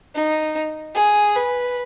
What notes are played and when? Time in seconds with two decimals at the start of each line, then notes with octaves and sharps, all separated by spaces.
0.15 D#4
0.95 G#4
1.35 B4